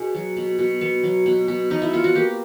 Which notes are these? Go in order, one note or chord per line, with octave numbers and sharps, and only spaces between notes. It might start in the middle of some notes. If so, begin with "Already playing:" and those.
Already playing: B2 G#4
F#3
B2
B2
B3
F#3
B2
B2
B2 D#4
E4
B3 F4
F#4
A#3 G4